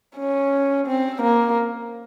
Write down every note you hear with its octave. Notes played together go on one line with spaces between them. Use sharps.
C#4
C4
A#3